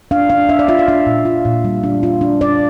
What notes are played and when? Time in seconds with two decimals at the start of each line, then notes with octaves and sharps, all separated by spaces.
0.11 D4 F5
0.30 D4 F5
0.49 D4 E5
0.59 D5
0.68 F4 E5
0.79 F5
0.88 D4 E5
1.06 A#2
1.25 F4
1.45 A#2
1.65 G3
1.83 D4
2.03 F4
2.21 D4
2.41 D4 D5